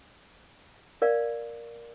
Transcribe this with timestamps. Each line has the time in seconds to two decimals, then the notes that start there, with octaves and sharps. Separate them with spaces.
1.02 A#4 D5 F5